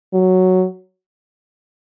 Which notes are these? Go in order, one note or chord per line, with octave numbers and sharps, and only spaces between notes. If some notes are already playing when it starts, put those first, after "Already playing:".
F#3